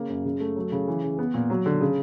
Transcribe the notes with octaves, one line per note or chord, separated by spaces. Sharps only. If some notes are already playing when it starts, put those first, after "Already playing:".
Already playing: C#3 A#3
F#2
C#3
A3
F#3
C#3
E3
C#3
B3
A#2
F#3
D3
C#3